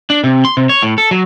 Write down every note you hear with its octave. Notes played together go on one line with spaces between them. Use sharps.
D4
C3
C6
C3
C#5
A2
A4
F#3